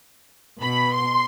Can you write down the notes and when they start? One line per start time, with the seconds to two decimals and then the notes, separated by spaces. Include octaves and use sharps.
0.61 B2 B5
0.93 C6